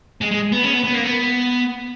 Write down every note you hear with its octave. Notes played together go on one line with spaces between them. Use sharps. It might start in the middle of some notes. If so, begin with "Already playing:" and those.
G#3
G#3
B3
C#4
B3
B3
A#3
B3